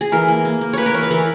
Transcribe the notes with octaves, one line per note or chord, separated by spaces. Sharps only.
G#4
E3 A#4
A#3
A#3
A#3
A#3 B4 C#5
A#4
E3 C#5
B4
E3 A#4